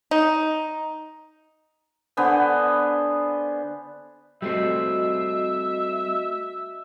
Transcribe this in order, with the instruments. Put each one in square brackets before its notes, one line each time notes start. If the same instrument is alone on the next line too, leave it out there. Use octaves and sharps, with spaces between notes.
[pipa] D#4
[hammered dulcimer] D3 B3 C5 G#5
[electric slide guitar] G3 A3 C4 [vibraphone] F#4 D#5 [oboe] E5